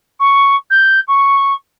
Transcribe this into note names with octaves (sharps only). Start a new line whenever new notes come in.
C#6
G6
C#6